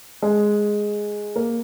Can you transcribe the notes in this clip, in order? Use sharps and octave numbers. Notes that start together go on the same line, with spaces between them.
G#3
A#3